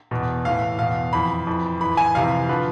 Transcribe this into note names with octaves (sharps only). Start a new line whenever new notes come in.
E2 B2
A2 E3 F5
E2 B2 F5
F2 E3 B5
F2 E3
F2 E3 B5
G#5
F2 C3 E3 F5
D3 F3 B4